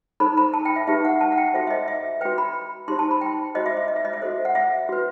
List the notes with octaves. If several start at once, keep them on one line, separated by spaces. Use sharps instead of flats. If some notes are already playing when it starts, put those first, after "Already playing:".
D#4 A4 C5 B5
B5
A5
G5
E5
D#4 G4 B4 E5
F#5
A5
F#5
G5
F#4 A4 C5 E5
E5
D#5
E5
F#4 B4 G5
B5
D#4 G4 C5 C6
A5
B5
G5
F#4 C5 D#5
E5
E5
D#5
E5
D#5
E5
F#4 A4 C5
F#5
E5
F#4 B4